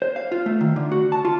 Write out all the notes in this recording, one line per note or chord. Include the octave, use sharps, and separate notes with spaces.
C5
F5
F4
A3
D#3
D3
F#4
A5
F4